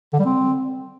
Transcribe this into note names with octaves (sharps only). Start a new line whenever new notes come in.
D3
G3
C4